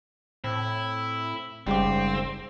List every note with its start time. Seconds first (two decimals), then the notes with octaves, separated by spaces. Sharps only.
0.44 A2 C4 E4
1.67 F#1 G#2 C#3 G3 C4 G4